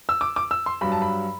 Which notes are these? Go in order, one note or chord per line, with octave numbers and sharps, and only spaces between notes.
E6
D6
D6
E6
C6
G2 F#3 B5
A5
B5